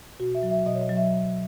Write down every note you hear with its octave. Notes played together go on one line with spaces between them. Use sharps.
B2 F#4
E5
F#3
E5
B2 D#5
C#5
D#5
F#3
E5